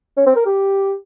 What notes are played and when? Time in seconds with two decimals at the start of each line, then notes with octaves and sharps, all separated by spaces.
0.17 C#4
0.27 C4
0.36 A#4
0.45 G4